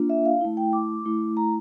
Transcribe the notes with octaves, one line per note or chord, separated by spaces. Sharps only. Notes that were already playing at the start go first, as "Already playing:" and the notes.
Already playing: A#3 D4 F4
E5
F5
A3 E4
G5
D6
A3 E4
A#5